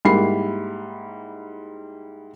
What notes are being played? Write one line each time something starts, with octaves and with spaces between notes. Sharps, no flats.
G#2 G3 A#3 E4 B5 C7